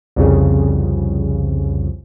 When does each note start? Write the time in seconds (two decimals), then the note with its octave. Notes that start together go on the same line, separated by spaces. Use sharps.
0.16 C2 F2 C#3